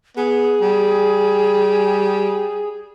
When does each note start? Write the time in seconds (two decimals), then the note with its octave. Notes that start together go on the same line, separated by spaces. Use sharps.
0.17 B3 G#4
0.61 G3